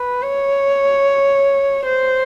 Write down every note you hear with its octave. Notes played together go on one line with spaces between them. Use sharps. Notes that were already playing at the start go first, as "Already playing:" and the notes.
Already playing: B4
C#5
C5